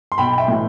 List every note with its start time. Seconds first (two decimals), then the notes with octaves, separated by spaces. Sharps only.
0.12 C6
0.18 B1 G5 B5
0.38 E5 G5
0.48 A2 E3